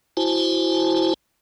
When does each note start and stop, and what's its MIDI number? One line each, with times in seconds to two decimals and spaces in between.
0.17 1.14 64
0.17 1.14 66
0.17 1.14 72
0.17 1.14 80
0.17 1.14 81